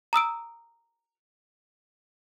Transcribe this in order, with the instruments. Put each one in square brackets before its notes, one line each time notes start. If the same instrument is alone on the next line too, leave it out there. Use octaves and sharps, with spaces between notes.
[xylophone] A#5 D#6 E6 D7